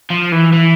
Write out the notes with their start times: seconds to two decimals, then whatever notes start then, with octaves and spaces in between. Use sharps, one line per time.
0.10 F3
0.32 E3
0.53 E3